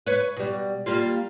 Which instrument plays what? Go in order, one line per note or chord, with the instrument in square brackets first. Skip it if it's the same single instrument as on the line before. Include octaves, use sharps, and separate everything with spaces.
[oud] B4 C#5
B2 G3
G3 A#3 F4